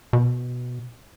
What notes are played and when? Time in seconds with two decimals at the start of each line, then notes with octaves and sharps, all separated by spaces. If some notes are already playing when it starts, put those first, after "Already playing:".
0.13 B2